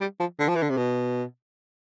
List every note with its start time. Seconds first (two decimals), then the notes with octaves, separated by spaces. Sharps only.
0.01 G3
0.20 F3
0.39 D3
0.49 F3
0.56 E3
0.63 D3
0.70 C3
0.77 B2